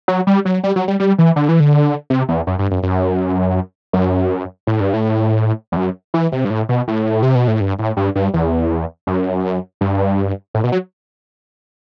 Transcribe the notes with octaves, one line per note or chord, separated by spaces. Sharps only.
F#3
G3
F#3
G3
F#3
G3
G3
E3
D3
E3
D3
C3
E2
F#2
G2
F#2
F#2
F#2
A2
G2
A2
E2
F#2
E3
C3
G2
A2
B2
A2
C3
B2
A2
G2
A2
G2
G2
E2
F#2
G2
A2
B2
F#3